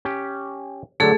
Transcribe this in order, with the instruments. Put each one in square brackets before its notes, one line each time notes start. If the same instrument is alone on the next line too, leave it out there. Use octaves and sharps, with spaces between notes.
[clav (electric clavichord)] C#4 G4
[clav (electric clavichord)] D3 F#3 [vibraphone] A3 G#4 A4